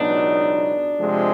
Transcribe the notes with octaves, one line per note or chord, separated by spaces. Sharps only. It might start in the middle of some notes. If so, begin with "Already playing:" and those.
Already playing: C#2 B2 F#3 B3 D4 D#4
C3 F3 G#3